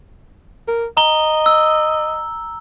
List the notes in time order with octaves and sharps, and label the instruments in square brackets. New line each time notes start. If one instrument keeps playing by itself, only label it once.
[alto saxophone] A#4
[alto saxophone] D#5 [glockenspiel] A#5 G7
[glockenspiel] E6